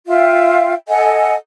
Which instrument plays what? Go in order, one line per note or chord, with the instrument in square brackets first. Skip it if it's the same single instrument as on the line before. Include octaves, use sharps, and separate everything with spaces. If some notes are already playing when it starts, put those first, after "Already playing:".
[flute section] F4 E5 F5 G5
A4 D#5 F#5 G#5